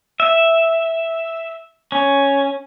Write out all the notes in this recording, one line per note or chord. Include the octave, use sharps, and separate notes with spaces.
E5
C#4